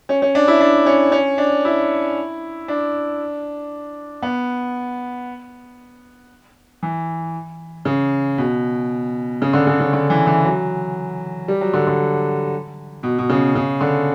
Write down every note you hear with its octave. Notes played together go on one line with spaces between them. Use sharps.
C#4
C#4
D4
E4
D4
C#4
C#4
D4
E4
D4
B3
E3
C#3
B2
C#3
D3
C#3
C#3
D3
E3
E3
F#3
G3
F#3
D3
D3
B2
B2
C#3
C#3
D3